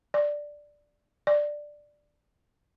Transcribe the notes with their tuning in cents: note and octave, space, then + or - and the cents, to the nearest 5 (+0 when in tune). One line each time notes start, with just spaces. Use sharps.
D5 +0
D5 +5